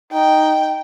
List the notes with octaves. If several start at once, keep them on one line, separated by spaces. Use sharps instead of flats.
D#4 G5